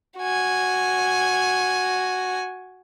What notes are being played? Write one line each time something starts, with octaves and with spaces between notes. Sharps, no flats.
F#4 G#5